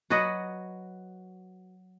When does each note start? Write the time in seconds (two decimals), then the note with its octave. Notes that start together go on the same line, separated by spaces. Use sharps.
0.10 F#3 F#4 B4 D#5